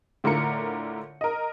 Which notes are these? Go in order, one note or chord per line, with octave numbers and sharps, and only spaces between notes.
A2 D3 F4 A#4 C#7
A#4 D#5